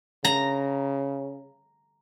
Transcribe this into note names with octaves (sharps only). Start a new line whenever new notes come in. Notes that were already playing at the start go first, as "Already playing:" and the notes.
C#3 A#5